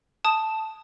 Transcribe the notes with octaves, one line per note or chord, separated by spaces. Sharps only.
A5 D#6 E7